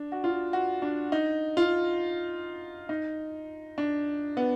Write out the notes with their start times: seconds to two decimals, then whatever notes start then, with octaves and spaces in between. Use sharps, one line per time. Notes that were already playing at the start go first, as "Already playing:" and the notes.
Already playing: D4
0.12 F#4
0.24 F4
0.53 F#4
0.82 D4
1.12 D#4
1.57 F4
2.89 D#4
3.78 D4
4.37 B3